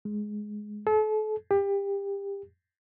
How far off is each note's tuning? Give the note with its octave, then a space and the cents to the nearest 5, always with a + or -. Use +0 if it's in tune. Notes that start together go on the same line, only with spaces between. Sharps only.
G#3 +10
A4 -35
G4 +25